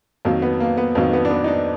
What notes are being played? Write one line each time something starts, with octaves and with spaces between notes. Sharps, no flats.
F2 D#3 F#3 A#3
B3
A#3
B3
F2 D#3 F#3 A#3
B3
D4
B3
D#4
D4